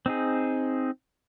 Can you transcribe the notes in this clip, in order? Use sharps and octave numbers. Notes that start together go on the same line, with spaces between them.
C4 D#4 G#4